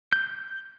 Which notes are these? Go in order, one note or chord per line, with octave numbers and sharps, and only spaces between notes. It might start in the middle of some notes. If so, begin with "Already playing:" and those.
G6